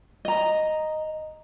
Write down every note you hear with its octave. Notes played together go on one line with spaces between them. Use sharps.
D#5 A#5